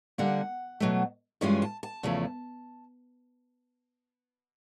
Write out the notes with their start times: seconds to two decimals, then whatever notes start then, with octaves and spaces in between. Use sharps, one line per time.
0.18 D3 G3 A#3 F#5
0.80 B2 F#3 A3
1.41 G2 E3 G#3 C#4 F4 G#5
1.62 A5
1.83 A5
2.03 E2 C#3 F3 A3